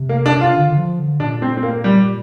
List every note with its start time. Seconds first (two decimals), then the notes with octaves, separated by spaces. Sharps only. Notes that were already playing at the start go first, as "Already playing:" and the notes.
Already playing: C3
0.09 A#3
0.26 D4
0.41 F4
0.57 D3
0.70 D3
0.77 F3
0.99 D3
1.20 A#2 D4
1.42 C4
1.57 C4
1.63 A#3
1.84 G3